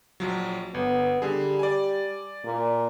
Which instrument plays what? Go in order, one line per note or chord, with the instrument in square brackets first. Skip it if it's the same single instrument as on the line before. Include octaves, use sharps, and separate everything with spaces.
[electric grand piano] A#1 F3 F#3
[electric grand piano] G1 [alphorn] B3
[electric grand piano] D3 G#4 [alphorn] G3
[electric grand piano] D5 G#5
[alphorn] A#2